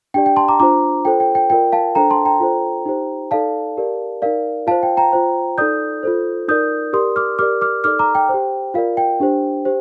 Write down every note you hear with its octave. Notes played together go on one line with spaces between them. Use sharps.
D4 G4 D5 G5
G5
A5 C6
A#5 D6
D4 F4 C5 A#5 D6
F4 A4 C5 G5
G5
G5
F4 A#4 D5 G5
F5 A5
D4 A4 C5 G5 A#5
A5 C6
G5 A#5
F4 A4 C5
D#4 G4 C5
D#4 A4 D5 F5 A5
G4 A#4 D5
D#4 A#4 D5 F5
F4 C5 F5 A5
G5
G5 A#5
F4 C5
D#4 A4 D5 D#6 G6
F4 A4 C5
D#4 A#4 D5 D#6 G6
G4 A#4 D5 C6 D#6
D6 F6
G4 A#4 D5 D6 F6
D6 F6
D#4 A4 D5 D6 F6
A#5 D6
G5
G4 C5
F4 A#4 D5 F5
G5
D4 G4 C5
G4 C5